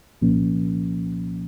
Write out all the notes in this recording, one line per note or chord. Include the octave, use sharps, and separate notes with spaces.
C2 A#2 F3 A#3 C#4